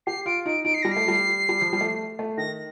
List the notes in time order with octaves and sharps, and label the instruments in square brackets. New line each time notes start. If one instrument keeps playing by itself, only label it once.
[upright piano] G4 [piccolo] C7
[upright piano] F4 [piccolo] D7
[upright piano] D#4 [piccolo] D7
[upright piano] D#4 [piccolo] D7
[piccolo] C7
[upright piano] G3 [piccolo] A#6
[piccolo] C7
[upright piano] A3
G3
G3
F3
G3
A3
A3
[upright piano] D#3 [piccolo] A#6